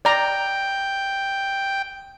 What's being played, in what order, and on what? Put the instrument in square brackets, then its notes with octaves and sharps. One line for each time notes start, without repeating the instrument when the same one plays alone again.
[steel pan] D5 A#5 [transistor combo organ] G5